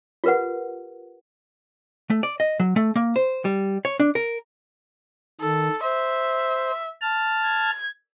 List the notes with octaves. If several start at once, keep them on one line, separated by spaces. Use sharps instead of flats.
F4 G4 A#4 B4 F#5
A3
D5
D#5
F#3
A3
A#3
C5
G3
C#5
D4
A#4
D#3 A4
C5 E5
A5 F6
G#6